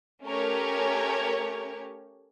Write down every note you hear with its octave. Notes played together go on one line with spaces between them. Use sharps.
A3 C#4 G4 A#4 C#5